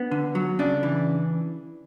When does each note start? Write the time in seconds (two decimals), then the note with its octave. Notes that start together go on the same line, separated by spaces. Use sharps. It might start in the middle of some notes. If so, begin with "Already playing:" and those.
Already playing: B3 D4
0.11 D3
0.35 F#3
0.59 C#3 D4
0.83 E3